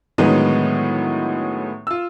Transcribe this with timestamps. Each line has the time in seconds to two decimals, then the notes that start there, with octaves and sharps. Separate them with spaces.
0.18 A2 D3 D#3 F#3 G#3 B3
1.87 F4 E6